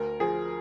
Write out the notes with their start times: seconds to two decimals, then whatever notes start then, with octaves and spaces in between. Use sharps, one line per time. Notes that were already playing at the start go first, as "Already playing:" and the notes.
Already playing: D2 A#4
0.20 F3 G#4